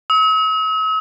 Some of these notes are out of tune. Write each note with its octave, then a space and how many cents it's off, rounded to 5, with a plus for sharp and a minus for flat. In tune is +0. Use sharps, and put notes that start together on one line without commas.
E6 -45